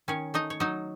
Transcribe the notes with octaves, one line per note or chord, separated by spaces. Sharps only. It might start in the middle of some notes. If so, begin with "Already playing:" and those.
D#3 C#4 C#5
A3 D#4 D#5
C#5
F#3 D#4 D#5